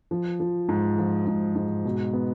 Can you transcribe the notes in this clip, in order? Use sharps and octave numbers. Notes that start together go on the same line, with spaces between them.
F3
F3
G#2
F3
G#2
G#2
B2
B3